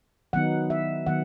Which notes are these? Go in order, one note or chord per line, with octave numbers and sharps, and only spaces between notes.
D#3 F#3 B3 D#4 F#5
E5
D#3 F#3 B3 F#5